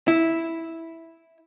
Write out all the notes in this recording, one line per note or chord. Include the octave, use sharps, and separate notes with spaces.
E4